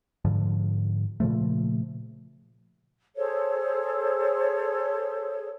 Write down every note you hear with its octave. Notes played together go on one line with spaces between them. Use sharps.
G#2 D3 F3
A#2 C#3 F3 A3
G#4 A4 C5 C#5